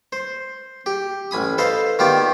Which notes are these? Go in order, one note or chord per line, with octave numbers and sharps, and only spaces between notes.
C5
G4
A1 G#5 B5 D#6
A4 B4 C5 D#5 F5 A5
D#3 B3 F4 G4 D5